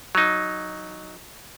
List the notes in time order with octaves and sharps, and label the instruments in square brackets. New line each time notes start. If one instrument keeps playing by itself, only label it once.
[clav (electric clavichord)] F#3 D#4